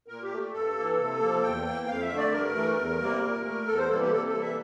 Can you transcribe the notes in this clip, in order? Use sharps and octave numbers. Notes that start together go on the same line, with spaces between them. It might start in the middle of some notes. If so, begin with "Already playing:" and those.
A#2 A#4
G4
A3
G2 A4
A#3
E3
C3
F3 A#3
E2 G5
E3 A#3
F2 F5
E5
D3 A3
D5
G2 A#4
E3 A3
E2
C3 G3 A#3
A#2
A3
E2 A4
C5
C3 E3 G3 A#3 A4
G4
C3 A4
A4
E3 G3 A#3
E5